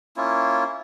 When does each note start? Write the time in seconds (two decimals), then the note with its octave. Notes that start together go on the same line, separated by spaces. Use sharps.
0.17 A#3 C#4 E4 F4